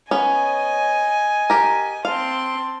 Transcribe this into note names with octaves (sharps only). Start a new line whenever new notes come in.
B3 C#4 D#5 G#5
G4 A#4
C4 F5 A5 C6